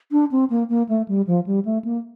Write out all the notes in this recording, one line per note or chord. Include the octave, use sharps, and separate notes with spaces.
D4
C4
A#3
A#3
A3
G3
F3
G3
A3
A#3